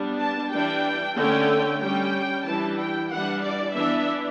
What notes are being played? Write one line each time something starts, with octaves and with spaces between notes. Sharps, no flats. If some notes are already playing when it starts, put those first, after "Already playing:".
Already playing: G3 B3 D4
A5
E3 G3 D4 G5
D3 A3 C#4 G5
G3 C#4 G5
E3 G3 D4 A5
G5
E3 G3 D4 F#5
D5
E3 B3 D4 E5